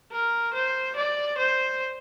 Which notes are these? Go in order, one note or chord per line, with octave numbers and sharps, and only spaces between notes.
A#4
C5
D5
C5